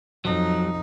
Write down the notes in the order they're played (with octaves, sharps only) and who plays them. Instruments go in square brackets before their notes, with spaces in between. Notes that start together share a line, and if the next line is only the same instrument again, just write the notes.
[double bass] F2 D#4 [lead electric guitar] F#3